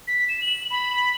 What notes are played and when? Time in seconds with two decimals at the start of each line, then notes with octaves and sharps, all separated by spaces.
0.08 B6
0.29 E7
0.41 F#7
0.71 B5